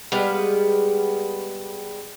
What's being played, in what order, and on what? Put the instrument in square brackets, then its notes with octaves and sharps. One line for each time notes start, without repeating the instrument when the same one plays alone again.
[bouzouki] G3 G#3 B3 F5